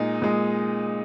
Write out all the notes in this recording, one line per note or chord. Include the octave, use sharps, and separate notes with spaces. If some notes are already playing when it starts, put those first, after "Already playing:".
Already playing: A#2 G#3 D#4
A#2 G#3